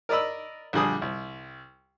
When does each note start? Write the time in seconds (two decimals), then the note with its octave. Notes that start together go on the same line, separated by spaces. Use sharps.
0.09 A#4 D5 D#5 B5 E6
0.73 A#1 D3 G3 G#4 D#6
1.02 C2